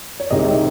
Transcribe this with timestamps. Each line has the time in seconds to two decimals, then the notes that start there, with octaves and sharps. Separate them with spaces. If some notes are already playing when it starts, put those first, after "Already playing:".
0.20 C#5
0.30 C2 C3 D#3 G#3 D#5